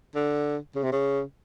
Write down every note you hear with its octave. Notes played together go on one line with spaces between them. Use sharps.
D3
C#3
C3
C#3